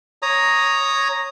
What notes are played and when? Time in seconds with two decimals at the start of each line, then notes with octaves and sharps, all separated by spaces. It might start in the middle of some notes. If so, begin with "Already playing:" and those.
0.22 C#5 A#5 D#6